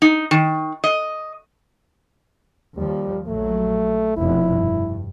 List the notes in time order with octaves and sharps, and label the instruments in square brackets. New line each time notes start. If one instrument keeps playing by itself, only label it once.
[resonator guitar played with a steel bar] D#4
D#3
D#5
[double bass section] D#2 F3 [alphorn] G3
[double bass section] A#1 F#3 [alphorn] A3
[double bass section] F1 F2 B2 [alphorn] E4
[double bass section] G2